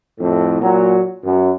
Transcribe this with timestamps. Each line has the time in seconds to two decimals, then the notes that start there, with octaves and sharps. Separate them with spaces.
0.20 F2 A2
0.60 A#2 F#3
1.24 F#2